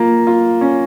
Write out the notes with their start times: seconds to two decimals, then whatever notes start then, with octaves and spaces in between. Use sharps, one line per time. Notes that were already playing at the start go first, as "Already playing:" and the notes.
Already playing: A#3 F4
0.27 F4
0.61 C#4